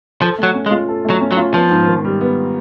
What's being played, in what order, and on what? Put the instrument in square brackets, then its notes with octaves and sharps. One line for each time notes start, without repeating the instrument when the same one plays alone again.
[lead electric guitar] F3 [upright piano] A4
[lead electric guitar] F#3 [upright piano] A3
[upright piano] C#4
[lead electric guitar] G#3
[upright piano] F4
A4
A3
[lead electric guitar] F#3
[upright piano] C#4
[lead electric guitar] F#3
[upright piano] F4
[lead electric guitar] F3 [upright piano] B3
[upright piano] G#2
D#3
G3
B3